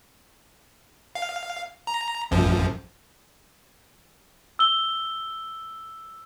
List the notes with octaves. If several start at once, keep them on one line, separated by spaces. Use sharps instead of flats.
F5
A#5
A1 F#2 F3
E6 G7